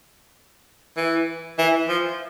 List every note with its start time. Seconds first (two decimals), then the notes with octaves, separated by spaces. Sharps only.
0.97 E3
1.59 E3
1.89 F3